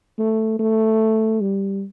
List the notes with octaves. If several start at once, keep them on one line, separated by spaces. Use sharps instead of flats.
A3
A3
G3